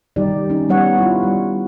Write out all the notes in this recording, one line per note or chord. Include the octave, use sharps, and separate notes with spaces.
D#3 G3 D#4 G4 D5
C#4 D#4
G3 B3 C#5 F#5
E4 F4
G3